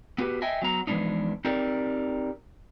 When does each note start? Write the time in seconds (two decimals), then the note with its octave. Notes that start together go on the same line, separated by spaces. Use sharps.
0.18 B3 F#4 G4 B4
0.42 D#5 E5 G5 G#5
0.62 F#3 B3 A#5
0.87 E3 F3 G#3 B3 D4 D#4
1.45 C4 D#4 G4 A#4 D5